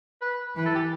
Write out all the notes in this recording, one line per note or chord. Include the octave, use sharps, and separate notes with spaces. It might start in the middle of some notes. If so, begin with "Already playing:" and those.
B4
E3 B4
A4
G4